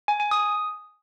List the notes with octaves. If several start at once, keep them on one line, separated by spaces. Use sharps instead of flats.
G#5
G#5
D#6